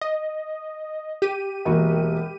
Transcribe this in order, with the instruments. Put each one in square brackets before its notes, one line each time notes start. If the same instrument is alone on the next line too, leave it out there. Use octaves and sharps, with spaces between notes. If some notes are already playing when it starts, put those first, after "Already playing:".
[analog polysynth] D#5
G4 D#7
[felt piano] E1 A#3 F#4